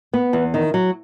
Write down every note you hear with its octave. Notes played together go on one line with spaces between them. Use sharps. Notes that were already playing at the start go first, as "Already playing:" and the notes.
B3
E2
D#3
F#3